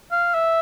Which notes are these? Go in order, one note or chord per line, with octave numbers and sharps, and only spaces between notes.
F5
E5